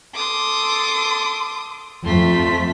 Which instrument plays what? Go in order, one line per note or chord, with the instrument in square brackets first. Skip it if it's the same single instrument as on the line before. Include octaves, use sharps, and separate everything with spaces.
[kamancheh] A4 C6 [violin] D6 D#6
[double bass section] F2 [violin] A3 B6 [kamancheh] C6